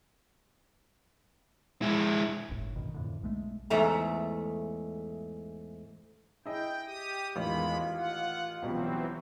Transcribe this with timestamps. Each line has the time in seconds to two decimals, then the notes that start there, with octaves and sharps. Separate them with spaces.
1.82 G#3 E4
2.49 D1 G1 A2
2.75 A1 F#2 B2 D#3
2.94 F2 A2 D3
3.23 B1 G#3 A3
3.70 E2 G#2 A3 A#5
6.46 E4 G#4 D#5 G5
6.86 G4 D#6
7.36 A1 E2 D#3 G#3 F4 B5
7.97 F#5
8.62 C#2 B2 E3 F#3 G3 C4